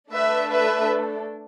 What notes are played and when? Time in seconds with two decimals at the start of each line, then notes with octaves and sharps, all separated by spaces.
0.11 A3 D4 A4 B4 E5
0.49 B4 E5